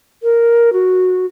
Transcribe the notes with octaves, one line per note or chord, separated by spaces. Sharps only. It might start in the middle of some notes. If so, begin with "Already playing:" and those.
A#4
F#4